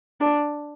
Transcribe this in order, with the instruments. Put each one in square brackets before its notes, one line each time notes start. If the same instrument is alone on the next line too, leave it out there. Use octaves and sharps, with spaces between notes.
[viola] D4